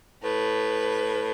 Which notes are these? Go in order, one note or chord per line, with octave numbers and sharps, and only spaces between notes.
A2 B4